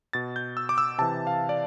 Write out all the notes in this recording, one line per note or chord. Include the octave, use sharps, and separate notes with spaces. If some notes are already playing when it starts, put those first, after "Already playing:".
B2 A6
G6
E6
D6
E6
C3 E3 A5
F5
D5